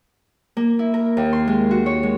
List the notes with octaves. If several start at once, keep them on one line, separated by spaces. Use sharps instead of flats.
A#3
E4
A#4
D#2
C6
G#3
F#4
C#5
G#3